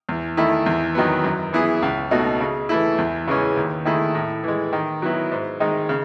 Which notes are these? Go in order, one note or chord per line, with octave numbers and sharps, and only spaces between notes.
E2
D#3 A3 E4
E2
D#3 F#3 B3
F#2
E3 B3 E4 G#4
C#2
B2 A3 D#4 F#4
C#3
E3 A3 E4
E2
C#3 E3 G#3 C#4
D#2
D#3 A3 E4 G#4
A2
E3 G#3
D#3
F#3 B3 E4
G#2
D#3 G#3 D#4
C#3